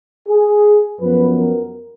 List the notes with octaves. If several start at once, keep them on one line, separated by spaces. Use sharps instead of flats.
G#4
F#2 F3 B3 B4
A#4